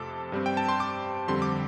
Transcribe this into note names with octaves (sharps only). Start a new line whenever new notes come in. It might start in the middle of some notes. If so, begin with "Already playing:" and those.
Already playing: F2 C3 A3 A4 A5 D6
G2 G3 C4
G5
A5
C6
D6
F2 D3 G3 C4 C6
D6